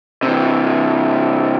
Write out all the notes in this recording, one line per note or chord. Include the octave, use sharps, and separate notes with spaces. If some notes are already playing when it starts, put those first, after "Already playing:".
C3 E3